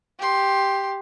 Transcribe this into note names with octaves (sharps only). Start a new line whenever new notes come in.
G4 C6